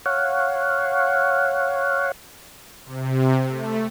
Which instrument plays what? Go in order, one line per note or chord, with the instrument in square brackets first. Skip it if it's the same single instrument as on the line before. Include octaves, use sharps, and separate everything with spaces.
[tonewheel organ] C#5 F5 F#5
[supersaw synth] C3
A3